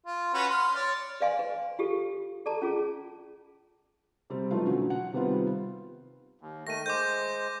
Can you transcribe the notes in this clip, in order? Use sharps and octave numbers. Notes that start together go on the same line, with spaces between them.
F4
C#4 F#4 B4
C6 F6
C#5 D5
B4 D5 F5 G#5 C6
B4
F4 G4 A4
A4 D5 A5 A#5
C#4 F4 G#4
C3 G3 C4
F#2 E3 F3 A3 D#4 F4
B2 D3 F#3 C#4
F#5
C3 D#3 G3 B3 C4 F4
D#2
D#3 A3 A#6 D#7
G#3 C5 D6 G6